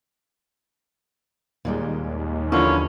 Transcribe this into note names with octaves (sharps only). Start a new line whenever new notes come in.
D#2 A#2 G3 G#3
D3 F3 C#4 E4 F4 A#4 B4